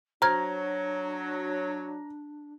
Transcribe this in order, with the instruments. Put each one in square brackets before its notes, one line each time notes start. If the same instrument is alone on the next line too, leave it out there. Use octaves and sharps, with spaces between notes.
[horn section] F#3 [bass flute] D4 [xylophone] C5 F6 G#6 [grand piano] A#5